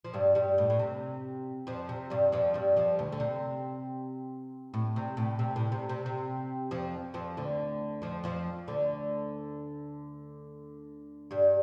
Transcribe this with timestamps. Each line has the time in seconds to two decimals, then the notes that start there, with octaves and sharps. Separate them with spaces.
0.04 F3
0.14 G2 G3
0.35 G2 G3
0.58 A2
0.70 A2
0.79 C3
1.67 F2 F3
1.89 C3
2.10 G2 G3
2.32 F2 F3
2.54 G2 G3
2.76 F2 F3
2.99 D2 D3
3.12 D3
3.20 C3
4.74 A2
4.96 C3
5.17 A2
5.39 C3
5.56 A2
5.72 C3
5.89 C3
6.06 C3
6.71 F2 F3
7.14 F2 F3
7.37 D2 D3
8.02 F2 F3
8.24 F2 F3
8.67 D2 D3
11.31 G2 G3